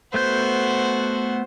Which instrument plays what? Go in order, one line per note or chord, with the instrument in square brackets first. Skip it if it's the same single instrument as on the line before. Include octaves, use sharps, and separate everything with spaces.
[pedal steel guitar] A3 B3 G6 [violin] F#4 C5